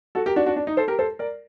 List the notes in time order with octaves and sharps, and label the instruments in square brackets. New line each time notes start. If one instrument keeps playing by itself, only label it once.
[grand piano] F#4 A4
G4 A#4
D4 F#4
D4 F#4
D4
D#4
A4 C5
G4 A#4
A4 C5
A#4 D5